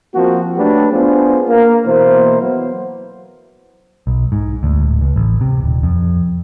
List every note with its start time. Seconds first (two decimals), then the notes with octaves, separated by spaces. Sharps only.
0.14 F3 A#3 C4 F#4
0.57 F#3 A3 D4 G4 A4 B4
0.92 B3 D4 F4 G#4 B4 C5
1.48 A#3
1.85 B2 E3 A#3 E4 C5
2.41 F#3 B3
4.07 B1
4.32 G#2
4.63 D2
4.83 D1
5.01 C#2
5.16 A1
5.41 C3
5.63 D#1
5.83 F2